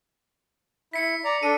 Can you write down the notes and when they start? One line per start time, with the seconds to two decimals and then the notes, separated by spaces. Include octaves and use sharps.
0.93 E4 B6 C#7
1.24 D5 A#5
1.43 D4 A4 D#7